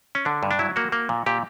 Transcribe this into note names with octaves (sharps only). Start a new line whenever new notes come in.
C#4
D3 D4
G2
D4
F#3 E4
A#3 F#4
A#3
A#2
A#2 G4